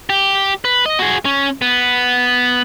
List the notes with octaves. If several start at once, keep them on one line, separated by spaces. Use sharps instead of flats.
G4
B4
D#5
F#4 G#4
C#4
B3